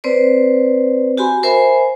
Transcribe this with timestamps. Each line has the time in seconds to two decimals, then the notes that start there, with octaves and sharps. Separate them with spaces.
0.04 C4 B4 C5 D5
1.17 F#4 G4 G#5 B5 C6
1.43 A#4 C5 E5 G#5 B5